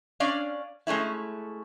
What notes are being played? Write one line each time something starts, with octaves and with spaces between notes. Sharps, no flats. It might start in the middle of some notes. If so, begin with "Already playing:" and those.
C#4 D4 D5 F5
G#3 A3 C#4 E4